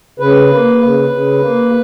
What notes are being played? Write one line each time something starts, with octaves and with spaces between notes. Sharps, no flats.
C#3 B4
A#3
C#3
C#3
A#3